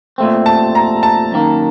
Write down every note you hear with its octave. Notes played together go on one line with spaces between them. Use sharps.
A#2 A3 C4
A5
A#5
A5
F#2 D#3 A#3